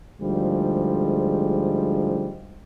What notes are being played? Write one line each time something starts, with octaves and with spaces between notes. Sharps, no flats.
D2 G#2 F3 G3 G#3